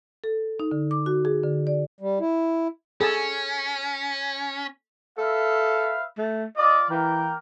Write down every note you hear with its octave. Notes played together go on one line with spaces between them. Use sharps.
A4
D#4
D3
D6
F#4
G#4
D3
D5
G3
E4
C#4 G#4 A4 A5
A4 B4 E5 F5
A3
F4 D5 D#5
E3 A#3 A#4 G5